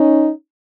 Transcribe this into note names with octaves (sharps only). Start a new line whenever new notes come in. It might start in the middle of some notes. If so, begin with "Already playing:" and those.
Already playing: C#4 D#4